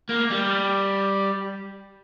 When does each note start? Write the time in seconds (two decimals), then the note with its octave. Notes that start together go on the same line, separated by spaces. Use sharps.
0.09 A#3
0.30 G3